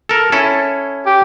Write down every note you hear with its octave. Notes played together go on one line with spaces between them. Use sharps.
A4 A#4
C#4 E4 A4
G4